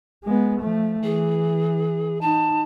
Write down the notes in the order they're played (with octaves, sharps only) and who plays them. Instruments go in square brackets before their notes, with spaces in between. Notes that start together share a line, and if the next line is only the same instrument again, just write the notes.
[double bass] G#3 B3
F3 A3
[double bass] E3 [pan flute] G#4
[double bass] D#4 [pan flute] A5